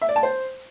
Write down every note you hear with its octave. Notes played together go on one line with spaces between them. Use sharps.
E5
D5
A5
C5